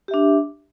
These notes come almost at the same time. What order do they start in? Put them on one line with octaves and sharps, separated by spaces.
G4 E5 D4